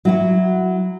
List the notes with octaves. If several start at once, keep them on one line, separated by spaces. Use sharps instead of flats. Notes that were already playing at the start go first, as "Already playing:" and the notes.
F#3 E4 F#4